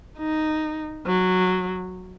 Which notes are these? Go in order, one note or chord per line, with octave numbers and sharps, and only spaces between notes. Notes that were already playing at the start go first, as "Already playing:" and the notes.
D#4
F#3